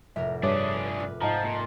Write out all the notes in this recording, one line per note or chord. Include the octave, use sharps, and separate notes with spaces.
F1 A2 A#4 E5
G2 D4 G#4 B4 C#5 D5 D6 B6
A#4 B4
G#2 F3 G4 D#5 F#5 A5 A#5
A#2